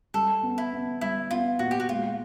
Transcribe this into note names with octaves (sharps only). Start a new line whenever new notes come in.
G3 A4
B3
E4
B3
G3 E4
B3 F4
A#2 F#4
G4
F#4
G#3 F4